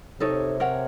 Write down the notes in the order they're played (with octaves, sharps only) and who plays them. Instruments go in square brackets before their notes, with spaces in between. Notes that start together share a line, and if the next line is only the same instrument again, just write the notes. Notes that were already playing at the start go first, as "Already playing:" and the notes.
[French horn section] C3 [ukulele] D#4 A4 C#5
[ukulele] A#4 C#5 F#5